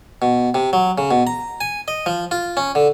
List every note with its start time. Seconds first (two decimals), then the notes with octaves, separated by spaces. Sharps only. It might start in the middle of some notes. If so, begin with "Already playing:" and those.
0.22 B2
0.54 C3
0.73 F#3
0.98 C#3
1.11 B2
1.27 A#5
1.61 G#5
1.88 D#5
2.06 F3
2.31 F4
2.57 C#4
2.75 D3